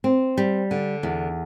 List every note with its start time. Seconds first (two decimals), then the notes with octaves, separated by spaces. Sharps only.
0.04 C4
0.37 G3
0.71 D3
1.03 E2